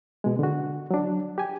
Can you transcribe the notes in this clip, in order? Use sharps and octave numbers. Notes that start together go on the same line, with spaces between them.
B2 G#3
D3 F#4
F#3 D4
G4 G#5